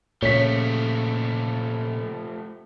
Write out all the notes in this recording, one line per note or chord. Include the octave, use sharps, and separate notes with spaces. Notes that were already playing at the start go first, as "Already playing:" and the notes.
A#2 C#3 F3 A3 C#5 B6